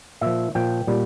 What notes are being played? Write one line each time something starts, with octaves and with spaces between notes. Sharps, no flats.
A#2 F3 E5
A#2 F3 G5
A#2 G3